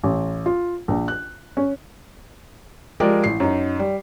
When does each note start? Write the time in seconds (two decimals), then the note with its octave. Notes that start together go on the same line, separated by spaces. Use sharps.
0.04 A1
0.46 F4
0.88 A#1
1.08 F#6
1.57 C#4
3.00 F3 G#3 G4 A#4 D5
3.24 A1 C7
3.40 F#2 D#4
3.79 G3